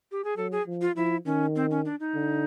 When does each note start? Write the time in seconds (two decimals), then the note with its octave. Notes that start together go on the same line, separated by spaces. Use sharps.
0.12 G4
0.24 G#4
0.37 F#3 A4
0.52 G#4
0.67 F3
0.82 F4
0.96 F3 E4
1.26 D#3 C#4
1.56 C4
1.71 C#4
1.85 D4
2.00 D#4
2.15 D3